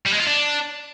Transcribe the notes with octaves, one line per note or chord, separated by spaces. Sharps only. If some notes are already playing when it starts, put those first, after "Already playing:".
G3
G#3
F4
D4